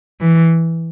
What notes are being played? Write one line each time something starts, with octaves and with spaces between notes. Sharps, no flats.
E3